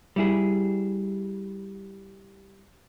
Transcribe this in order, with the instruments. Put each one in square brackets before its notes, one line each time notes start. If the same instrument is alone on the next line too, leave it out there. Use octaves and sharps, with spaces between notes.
[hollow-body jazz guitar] G3 E4 G#4